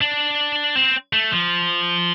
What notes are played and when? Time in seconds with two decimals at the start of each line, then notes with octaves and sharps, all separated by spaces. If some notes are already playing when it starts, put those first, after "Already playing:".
0.01 D4
0.75 C4
1.13 A3
1.32 F3